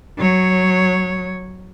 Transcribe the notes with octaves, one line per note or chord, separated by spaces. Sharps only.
F#3 C#5